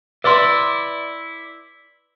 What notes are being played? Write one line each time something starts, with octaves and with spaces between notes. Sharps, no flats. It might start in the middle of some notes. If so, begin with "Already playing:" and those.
E4 B4 D5 E5 C6